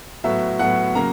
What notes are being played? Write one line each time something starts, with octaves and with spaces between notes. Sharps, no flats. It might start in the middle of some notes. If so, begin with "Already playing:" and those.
A2 F#3 B3 E5
A2 F#3 B3 F#5
C#3 F#3 A#3 A#5